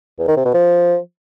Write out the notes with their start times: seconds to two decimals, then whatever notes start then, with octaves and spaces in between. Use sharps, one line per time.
0.19 E2
0.28 D#3
0.37 C3
0.45 B2
0.54 F3